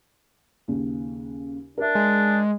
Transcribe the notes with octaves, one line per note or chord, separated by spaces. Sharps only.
D#2 C#3
D4 A#4 E5
G#3